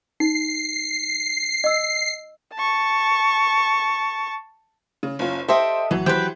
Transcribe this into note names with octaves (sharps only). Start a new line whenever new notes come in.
D#4 C7
D#5 E6
A5 C#6
C#3
F#1 C#4 F4
G4 A4 C5 D#5 E5 G5 C6
D1 E3 F#3
E3 G4 B4 C5 G5